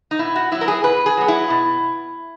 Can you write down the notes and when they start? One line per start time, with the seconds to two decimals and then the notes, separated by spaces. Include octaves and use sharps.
0.11 D#4
0.19 B2 E4
0.36 F#4
0.51 F#3 B3 E4
0.61 A#4
0.68 G#4
0.84 B2 B4
1.06 G#4
1.17 F#3 B3
1.28 E4
1.50 B2